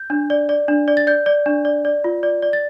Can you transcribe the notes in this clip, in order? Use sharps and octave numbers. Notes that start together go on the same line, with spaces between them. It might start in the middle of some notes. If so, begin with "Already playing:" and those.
Already playing: G6
D4
D5
D5
D4
D5
A6
D5 G6
D5
D4
D5
D5
F4
D5
D5
A6